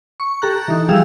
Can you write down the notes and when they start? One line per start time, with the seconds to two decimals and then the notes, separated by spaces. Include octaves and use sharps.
0.20 C#6
0.42 G4 A4 A#5 F#6
0.68 E3 D#4
0.88 F3 G3 G4 G#4 F5 E6